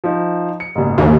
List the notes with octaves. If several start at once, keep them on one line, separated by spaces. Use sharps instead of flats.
F3 D#4
C#7
F#1 G#2
D#2